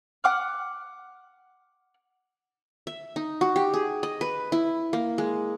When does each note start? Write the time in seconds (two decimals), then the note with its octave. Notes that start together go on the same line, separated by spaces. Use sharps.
0.24 F#5 D6 F6
2.87 E5
3.16 D#4
3.41 F#4
3.56 G4
3.74 G#4
4.03 D#5
4.21 B4
4.52 E4
4.93 A#3
5.18 G#3